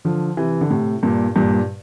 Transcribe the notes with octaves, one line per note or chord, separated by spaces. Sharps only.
D3 F3
C3 E3
D3
A2 C3
G2 A#2
G2 A#2